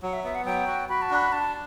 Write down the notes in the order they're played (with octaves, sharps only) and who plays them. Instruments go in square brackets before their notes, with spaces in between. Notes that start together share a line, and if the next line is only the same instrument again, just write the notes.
[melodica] F#3 [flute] F#5
[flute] E5
[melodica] B3 [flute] E5
[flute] F#5
[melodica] F#3 [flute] G5
[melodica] F#4
[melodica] F#4 [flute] B5
[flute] A5
[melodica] D4 [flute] B5
[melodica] D4 [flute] A5